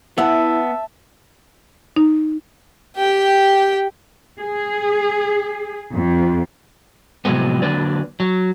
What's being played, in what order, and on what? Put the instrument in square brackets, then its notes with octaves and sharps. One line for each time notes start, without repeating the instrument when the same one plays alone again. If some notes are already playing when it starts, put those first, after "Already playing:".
[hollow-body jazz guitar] B3 F#5 [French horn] E4 [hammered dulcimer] E5 A5
[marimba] D#4
[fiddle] G4 G5
[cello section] G#4
F2
[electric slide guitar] A2 C3 F3 F#3 G#3 B3
D3 F#3 A#3 D4 B4 D5
F#3